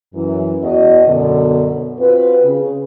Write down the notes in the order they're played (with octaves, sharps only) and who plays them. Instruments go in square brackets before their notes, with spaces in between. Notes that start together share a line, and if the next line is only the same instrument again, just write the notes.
[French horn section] F#2 E3
E2 F#4 D#5
F#2 B2 D3
C4 F4 F#4 B4
C#3